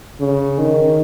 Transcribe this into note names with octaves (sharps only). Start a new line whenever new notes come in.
C#3
D#3